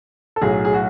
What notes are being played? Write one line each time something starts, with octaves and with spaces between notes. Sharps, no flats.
A4
B1 A2 F#3 G#4
G#4
F#4